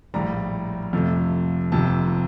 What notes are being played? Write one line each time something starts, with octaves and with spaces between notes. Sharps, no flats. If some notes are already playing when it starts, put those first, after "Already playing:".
A#1 A2 G3 A#5
F2 C3 F3 A3
F1 F2 C3 F3 A5